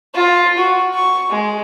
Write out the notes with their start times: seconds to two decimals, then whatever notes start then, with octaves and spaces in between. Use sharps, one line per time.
0.15 F4
0.58 F#4
0.94 C#6
1.30 G#3